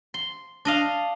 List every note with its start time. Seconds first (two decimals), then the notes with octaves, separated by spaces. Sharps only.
0.14 C6
0.65 D4 D#5 F5